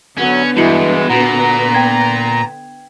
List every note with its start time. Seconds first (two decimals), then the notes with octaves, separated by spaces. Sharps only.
0.17 D3 F#3 B3 C#4
0.57 G2 E3 G#3 E4 F#4 C#7
1.10 A#2 F#4 F#5 A#5
1.74 G5 G#6